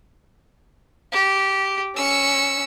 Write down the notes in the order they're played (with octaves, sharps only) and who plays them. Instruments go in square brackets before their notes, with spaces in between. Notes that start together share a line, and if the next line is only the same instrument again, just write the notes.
[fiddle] G4
[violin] C#4 C#7 [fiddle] E6